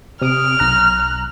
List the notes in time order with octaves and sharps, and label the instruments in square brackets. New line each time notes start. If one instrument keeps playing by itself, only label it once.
[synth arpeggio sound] C3 D#6 D7 [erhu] F6
[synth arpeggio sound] B1 A#5 F#6